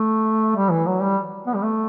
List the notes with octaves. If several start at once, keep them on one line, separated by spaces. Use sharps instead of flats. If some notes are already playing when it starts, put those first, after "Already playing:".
Already playing: A3
G3
E3
F#3
G3
B3
G3
A3